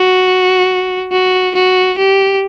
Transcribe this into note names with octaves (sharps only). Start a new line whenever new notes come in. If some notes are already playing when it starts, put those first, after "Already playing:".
Already playing: F#4
F#4
F#4
G4